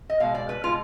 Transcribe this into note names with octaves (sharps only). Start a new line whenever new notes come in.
D#5
B2 G#3 F5
D5
B4
B2 G#3 F4